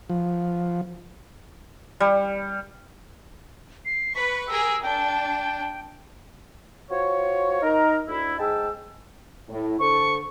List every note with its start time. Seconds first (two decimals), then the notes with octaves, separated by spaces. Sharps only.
0.10 F3
2.00 G3
3.85 C7
4.15 B4 C#6 B6
4.47 G4 G#4 A#4 E6
4.83 D4 G5
6.90 F4 F#4 C5 C#5
7.62 D#4 A#4
8.08 D2 E4
8.38 G#2 D#4 G#4 G5 A5 E6
9.49 A2
9.80 D3 A4 C5 C#6